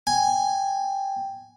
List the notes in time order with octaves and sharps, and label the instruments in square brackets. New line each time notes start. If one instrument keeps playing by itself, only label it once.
[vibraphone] G5 [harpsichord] G#5